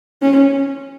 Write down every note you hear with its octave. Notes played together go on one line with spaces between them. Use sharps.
C#4